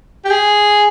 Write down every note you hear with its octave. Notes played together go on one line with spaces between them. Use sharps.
G4
G#4